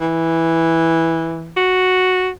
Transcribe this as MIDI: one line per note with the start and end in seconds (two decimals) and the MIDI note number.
0.01 1.57 52
1.57 2.30 66